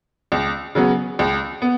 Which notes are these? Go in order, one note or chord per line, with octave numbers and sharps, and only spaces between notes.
C#2
C#3 F#3 B3
C#2
B3